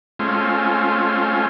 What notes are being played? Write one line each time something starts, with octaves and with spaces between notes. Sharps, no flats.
G#3 A3 C4 C#4 F4